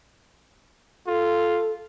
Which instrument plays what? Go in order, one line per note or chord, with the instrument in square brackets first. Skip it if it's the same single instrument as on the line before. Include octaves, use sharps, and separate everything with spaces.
[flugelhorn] F4 [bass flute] A4